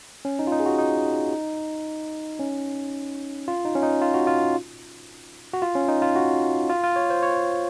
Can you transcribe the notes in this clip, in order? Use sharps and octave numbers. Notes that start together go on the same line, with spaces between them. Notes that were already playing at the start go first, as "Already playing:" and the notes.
C#4
D#4
F4
D#4
G#4
F#4
D#4
C#4
F4
D#4
C#4
D#4
F4
F#4
F4
F#4
F4
C#4
D#4
F4
F#4
F4
F4
C#5
C5
C#5